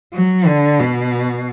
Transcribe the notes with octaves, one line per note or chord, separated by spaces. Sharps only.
F#3
D3
B2